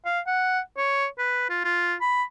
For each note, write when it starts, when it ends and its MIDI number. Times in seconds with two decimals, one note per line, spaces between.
0.05 0.20 77
0.27 0.59 78
0.77 1.06 73
1.18 1.46 71
1.50 1.63 65
1.64 1.94 65
2.01 2.23 83